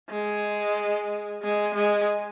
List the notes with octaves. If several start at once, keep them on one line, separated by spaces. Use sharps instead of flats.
G#3
G#3
G#3